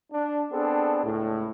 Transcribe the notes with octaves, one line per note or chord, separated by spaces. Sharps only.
D4
B3 C4 D4 G#4 A4
C#2 A2